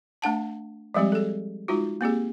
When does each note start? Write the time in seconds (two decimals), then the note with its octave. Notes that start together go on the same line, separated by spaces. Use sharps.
0.22 A3 D4 F#5 A5
0.94 F3 G3 G#3 C4 G4
1.12 G#4 A4
1.68 G#3 D#4 F4 F#4
2.01 A#3 C4 G4 G#4